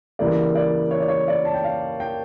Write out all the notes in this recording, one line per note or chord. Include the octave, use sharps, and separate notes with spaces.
C#3 E3 G3 A#3 D5
D5
C#5
D5
C#5
D5
A5
G5
F5
G5